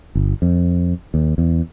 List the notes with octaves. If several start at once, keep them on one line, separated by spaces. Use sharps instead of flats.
G1
F2
D#2
E2